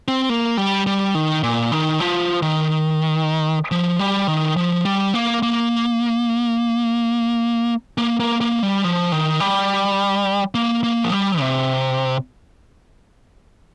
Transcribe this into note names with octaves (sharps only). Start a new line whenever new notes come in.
C4
A#3
G3
G3
D#3
A#2
D#3
F3
D#3
F3
G3
D#3
F3
G3
A#3
A#3
A#3
A#3
A#3
G3
F3
D#3
G3
A#3
A#3
F3
G3
C3